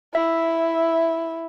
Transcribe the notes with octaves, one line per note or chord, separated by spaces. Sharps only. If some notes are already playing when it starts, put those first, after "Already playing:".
E4 E5